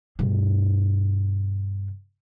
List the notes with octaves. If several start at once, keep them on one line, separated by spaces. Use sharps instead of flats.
G2 B2